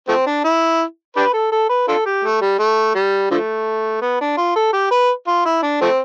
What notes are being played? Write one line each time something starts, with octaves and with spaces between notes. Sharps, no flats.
F3 A3 C4
D4
E4
D4 G4 B4
A4
A4
B4
D4 F4 A4
G4
A3
G3
A3
G3
D3 F3 A3
B3
D4
F4
A4
G4
B4
F4
E4
D4
F3 A3 C4